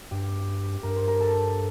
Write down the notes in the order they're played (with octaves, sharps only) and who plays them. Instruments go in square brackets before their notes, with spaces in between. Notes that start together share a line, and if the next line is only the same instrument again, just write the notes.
[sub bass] G2 [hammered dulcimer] G4
[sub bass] G2 [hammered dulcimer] A#4
[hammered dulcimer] C5
A#4
A4